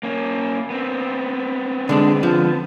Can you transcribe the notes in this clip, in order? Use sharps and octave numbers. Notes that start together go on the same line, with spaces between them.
A#3 C#4
B3 C4
D3 G#3 D4
D3 F3